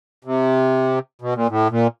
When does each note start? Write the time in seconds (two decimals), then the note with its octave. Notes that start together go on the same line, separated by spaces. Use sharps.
0.25 C3
1.22 B2
1.35 A#2
1.49 A2
1.71 A#2